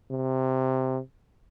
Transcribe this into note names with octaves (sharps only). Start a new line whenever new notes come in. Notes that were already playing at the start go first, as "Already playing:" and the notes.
C3